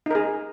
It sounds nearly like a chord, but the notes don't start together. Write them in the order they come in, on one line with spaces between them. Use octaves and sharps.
D#4 A#4 G#4